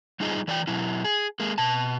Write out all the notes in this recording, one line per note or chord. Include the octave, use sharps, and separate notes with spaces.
G3 D#4 F4 G#4 D#5
E3 D5 D#5 G5
B2 F#3 E4
G#4
G#3 A#3
B2 A5